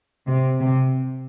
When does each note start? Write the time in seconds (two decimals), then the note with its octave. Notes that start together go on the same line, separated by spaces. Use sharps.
0.27 C3
0.61 C3